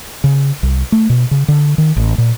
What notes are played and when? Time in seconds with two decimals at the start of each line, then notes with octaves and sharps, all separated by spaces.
0.24 C#3
0.63 C2
0.92 A3
1.10 B2
1.31 C#3
1.48 D3
1.78 D#3
1.96 A1
2.18 A#2